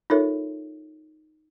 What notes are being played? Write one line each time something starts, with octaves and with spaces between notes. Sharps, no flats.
D#4 F4 A4 A#4 C#5 E5